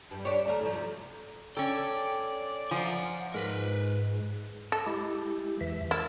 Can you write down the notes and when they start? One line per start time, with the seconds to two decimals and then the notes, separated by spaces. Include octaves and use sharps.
0.11 G2
0.25 D4 G4 C#5
0.46 D2 A3 A#4
0.61 A2 F3
0.72 C3
1.57 C#4 A4 D5 G5
2.71 F3 F#5 G#5
3.34 G#2 A#4 B4
4.72 A4
4.86 G#3 E4 G4
5.61 E2 E3 E5
5.91 E4 A#4 E6 A6